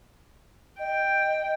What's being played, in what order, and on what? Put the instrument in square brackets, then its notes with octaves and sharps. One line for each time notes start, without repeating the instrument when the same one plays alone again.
[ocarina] D#5 [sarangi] G5